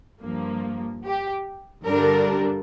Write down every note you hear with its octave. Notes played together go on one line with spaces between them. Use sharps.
G2 F3 A#3
G4
G2 D3 G3 D4 A#4